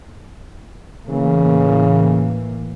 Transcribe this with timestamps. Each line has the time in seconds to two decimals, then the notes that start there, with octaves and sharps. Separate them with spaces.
1.10 A2 C#3 E3 A#3